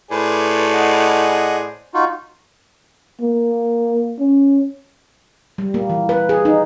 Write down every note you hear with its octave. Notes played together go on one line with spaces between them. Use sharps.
A2 G#4 B4 C5 D5
D#5 F#5
D#4 F4 F#4
A#3
C#4
G3
A#3
E3
B4
G#4
D#4